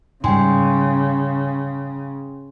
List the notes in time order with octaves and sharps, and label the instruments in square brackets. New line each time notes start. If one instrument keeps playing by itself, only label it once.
[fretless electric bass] G#2 G3 [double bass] C#3 [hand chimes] G5 G#5 C6